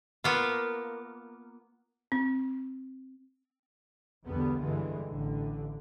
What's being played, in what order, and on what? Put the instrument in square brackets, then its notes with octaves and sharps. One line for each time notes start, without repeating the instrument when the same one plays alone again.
[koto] A#3 B3 F4
[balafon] C4
[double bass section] B1 E2 D3 G3 B3
G2 D3 E3 G#3
A1 D3